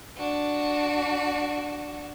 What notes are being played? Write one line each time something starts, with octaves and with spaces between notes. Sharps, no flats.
D4 F#4